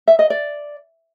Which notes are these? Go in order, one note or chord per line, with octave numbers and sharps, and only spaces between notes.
E5
D#5
D5